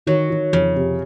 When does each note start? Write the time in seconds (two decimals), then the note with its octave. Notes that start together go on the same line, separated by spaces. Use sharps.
0.07 D#3 F#3
0.30 D#3
0.53 F2 C#3
0.76 C3